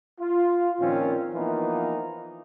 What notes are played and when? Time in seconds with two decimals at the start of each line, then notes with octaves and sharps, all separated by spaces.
0.20 F4
0.80 A#2 D#3 F3 C4 C#4 F4
1.34 E3 F3 A#3 B3 D#4 F4